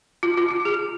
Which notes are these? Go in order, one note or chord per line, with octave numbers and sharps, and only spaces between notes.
F4
F4
F4
G#4